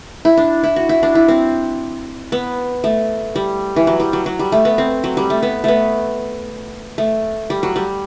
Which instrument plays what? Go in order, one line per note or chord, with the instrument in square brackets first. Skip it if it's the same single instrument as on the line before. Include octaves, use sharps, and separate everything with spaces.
[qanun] E4
D4
E4
F#4
E4
D4
E4
C4
B3
A3
G3
E3
F#3
G3
F#3
F#3
G3
A3
B3
C4
F#3
G3
A3
B3
A3 B3
A3
G3
F#3
G3